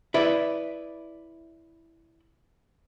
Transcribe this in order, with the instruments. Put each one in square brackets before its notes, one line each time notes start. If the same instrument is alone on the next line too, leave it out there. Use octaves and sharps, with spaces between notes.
[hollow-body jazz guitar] E4 B4 D5